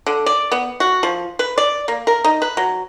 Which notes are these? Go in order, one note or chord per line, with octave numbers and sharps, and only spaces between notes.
D3
D5
B3
F#4
F3
B4
D5
A#3
A#4
D#4
B4
F#3